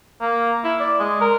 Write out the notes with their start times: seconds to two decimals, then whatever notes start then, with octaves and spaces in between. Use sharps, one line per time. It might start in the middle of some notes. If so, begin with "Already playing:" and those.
0.21 A#3
0.64 E4
0.80 D5
1.00 G#3
1.21 A#4